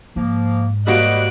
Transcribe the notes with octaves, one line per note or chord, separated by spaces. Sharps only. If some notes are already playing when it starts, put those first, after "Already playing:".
G#2 F3 A#3
G3 A#3 F#4 C5 D5 D#5 F#6 D7